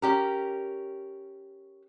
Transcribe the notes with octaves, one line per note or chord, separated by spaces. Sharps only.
C#4 G4 A#4